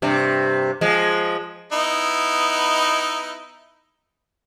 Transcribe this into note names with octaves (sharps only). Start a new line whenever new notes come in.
G2 C3
F3 G#3
B3 D#4 E4